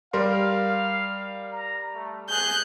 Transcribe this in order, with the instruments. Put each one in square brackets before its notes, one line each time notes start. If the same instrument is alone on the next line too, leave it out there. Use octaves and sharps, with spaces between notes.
[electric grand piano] G3 A#4 C6 [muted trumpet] F5
[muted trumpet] A#5
A3
[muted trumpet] G#4 [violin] F#6 G6